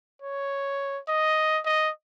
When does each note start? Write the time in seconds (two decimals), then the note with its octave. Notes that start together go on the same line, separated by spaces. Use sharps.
0.22 C#5
1.08 D#5
1.65 D#5